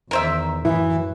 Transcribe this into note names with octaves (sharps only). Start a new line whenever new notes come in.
E2 D#3 A#4 C5 E5
F#2 A2 E3 E4